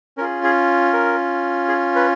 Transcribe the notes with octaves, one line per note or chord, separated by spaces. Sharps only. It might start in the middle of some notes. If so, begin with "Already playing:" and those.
C#4 F4 G#4 A#4
G#4
A#4
G#4
B4